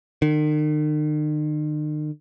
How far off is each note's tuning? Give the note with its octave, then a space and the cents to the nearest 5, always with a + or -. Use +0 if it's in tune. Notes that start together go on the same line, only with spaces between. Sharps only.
D#3 -45